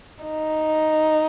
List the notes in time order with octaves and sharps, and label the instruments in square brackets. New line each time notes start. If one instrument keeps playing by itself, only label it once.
[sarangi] D#4